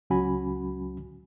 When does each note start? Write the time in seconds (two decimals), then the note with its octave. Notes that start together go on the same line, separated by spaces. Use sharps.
0.10 C#2 F#3 C#4 F#4 G#5 B5